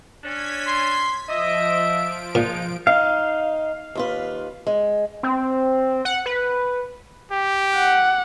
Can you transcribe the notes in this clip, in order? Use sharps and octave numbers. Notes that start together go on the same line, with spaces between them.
C#4 D4 G#6 B6
C6
F3 D#5 E5 D7
A#2 G#3 D#4 F4
D#4 F5
D#2 F4 B4
G#3
C4
F#5
B4
G4
F#5